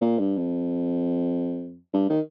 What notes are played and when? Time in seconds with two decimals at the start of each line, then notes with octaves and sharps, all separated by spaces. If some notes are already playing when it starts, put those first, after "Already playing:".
0.01 A#2
0.19 G2
0.37 F2
1.93 G2
2.09 D#3